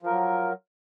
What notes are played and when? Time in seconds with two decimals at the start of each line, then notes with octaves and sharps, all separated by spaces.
0.02 F3
0.06 A#4
0.10 F#3